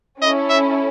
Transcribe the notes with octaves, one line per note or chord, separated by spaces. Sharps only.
C#4 E4 A4 D#5
E5